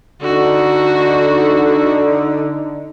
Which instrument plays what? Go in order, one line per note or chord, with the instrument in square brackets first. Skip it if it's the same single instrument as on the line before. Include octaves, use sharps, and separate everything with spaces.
[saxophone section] D3 [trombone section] D4 D#4 [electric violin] F#4